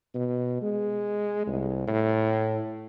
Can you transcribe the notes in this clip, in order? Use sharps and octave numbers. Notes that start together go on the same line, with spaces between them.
B2
G#3
C2
A2